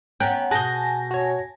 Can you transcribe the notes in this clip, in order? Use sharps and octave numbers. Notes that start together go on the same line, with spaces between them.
B3 C#4 G5 A#5 F#6
B2 G#4 G#5 A5 F#6 G6 A#6
F#4 C#5